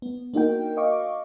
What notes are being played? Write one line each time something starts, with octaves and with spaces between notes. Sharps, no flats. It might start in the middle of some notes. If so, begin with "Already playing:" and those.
B3
A#3 D4 D#4 F#4 A#4 G5
D#5 F5 C#6 D6